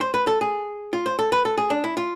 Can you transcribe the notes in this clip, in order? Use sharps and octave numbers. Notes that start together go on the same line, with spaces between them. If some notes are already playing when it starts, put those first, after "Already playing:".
C5
B4
A4
G#4
F4
C5
A4
B4
A4
G#4
D4
E4
F4